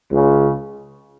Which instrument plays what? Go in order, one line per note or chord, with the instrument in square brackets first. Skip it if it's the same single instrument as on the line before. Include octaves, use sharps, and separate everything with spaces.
[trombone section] C#2 C#3